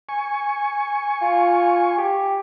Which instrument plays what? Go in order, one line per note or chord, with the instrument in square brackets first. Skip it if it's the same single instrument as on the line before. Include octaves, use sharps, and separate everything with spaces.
[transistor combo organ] G#5 C#6
[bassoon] F4
G4